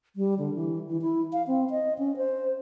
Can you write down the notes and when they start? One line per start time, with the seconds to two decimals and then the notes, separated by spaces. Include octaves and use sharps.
0.16 G3
0.39 D3
0.54 E3
0.89 E3
1.02 E4
1.33 F5
1.47 C4
1.70 D#5
1.99 C#4
2.17 C5